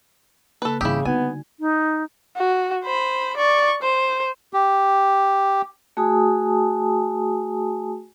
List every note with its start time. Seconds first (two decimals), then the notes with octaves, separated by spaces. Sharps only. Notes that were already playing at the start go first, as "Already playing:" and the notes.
0.62 C#3 A#3 A4 B4
0.81 G#1 C#3 E3 G3 E4 G4 D#6 E6
1.05 D3 B3 D#4 F#4 G#5 G#6
1.60 D#4
2.37 F#4
2.85 C5 B5
3.37 D5 C#6
3.82 C5
4.53 G4
5.97 A3 F#4 G#4 G#5 A5 D#6